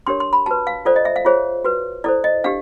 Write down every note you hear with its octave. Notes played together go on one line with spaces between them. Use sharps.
D4 G4 A#4 C#5 C6
C6
B5
F#4 B4 A5
F5
F4 A4 C5 D5
D#5
E5
F5
F4 G#4 C5 C#5
F#4 B4
E4 A4 C5 D5
D#5
D4 G4 F5